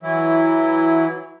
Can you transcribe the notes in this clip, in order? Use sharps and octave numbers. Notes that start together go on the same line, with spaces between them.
E3 F#3 E4